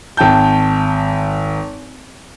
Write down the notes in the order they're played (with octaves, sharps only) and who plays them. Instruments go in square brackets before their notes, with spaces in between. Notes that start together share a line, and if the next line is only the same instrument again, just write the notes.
[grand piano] G#1 G5 A5 G6